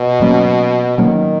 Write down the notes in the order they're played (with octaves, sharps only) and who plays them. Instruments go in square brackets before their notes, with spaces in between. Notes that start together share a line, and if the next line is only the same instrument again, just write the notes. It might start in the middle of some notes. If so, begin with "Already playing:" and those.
Already playing: [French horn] B2
[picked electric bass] A#2 F#3 A#3 C#4
[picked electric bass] A#2 F#3 A#3 C#4 [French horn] D#3